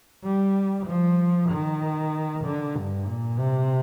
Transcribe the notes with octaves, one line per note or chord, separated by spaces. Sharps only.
G3
F3
D#3
D3
G2
A#2
C3